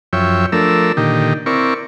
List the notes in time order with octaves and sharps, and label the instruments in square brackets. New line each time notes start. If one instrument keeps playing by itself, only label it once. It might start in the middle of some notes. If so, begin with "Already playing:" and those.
[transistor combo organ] F#2 F3 C#5 E5 G5
F3 A3 D4 A#4 E6
A#2 D3 D#3 D#4 G4
C4 E4 A#4 D5 C#6